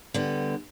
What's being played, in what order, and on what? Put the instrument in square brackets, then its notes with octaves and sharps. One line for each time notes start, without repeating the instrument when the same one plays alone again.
[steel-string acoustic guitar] D3 G3 B3